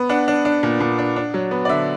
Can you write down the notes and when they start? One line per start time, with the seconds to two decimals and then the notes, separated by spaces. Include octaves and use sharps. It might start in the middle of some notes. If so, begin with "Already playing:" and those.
Already playing: B3
0.09 D4 F#5
0.28 D4
0.45 D4
0.63 A#2
0.80 A#2
0.99 D4
1.16 D4
1.34 F#3
1.51 B3
1.65 D5
1.69 D3 E5